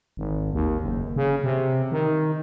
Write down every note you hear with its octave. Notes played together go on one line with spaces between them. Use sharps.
G#1
D#2
F#1
C#3
C3
D#3